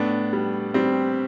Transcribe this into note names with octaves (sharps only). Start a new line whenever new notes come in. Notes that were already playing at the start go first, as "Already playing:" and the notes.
Already playing: A2 B3 D4
G3
G3 C4